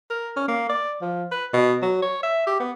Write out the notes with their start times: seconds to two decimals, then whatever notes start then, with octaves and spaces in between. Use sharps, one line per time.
0.10 A#4
0.37 C#4
0.48 A#3
0.69 D5
1.02 F3
1.31 B4
1.53 B2
1.82 F#3
2.02 C#5
2.23 E5
2.47 G4
2.60 B3